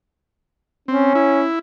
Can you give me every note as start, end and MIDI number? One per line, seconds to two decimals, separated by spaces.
0.88 1.13 60
0.88 1.47 61
1.15 1.59 64